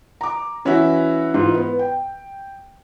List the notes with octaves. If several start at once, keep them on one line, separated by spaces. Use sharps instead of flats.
A#5 D6
E3 C#4 E4 F#4 E5
G#2 E3 F4
B3
G5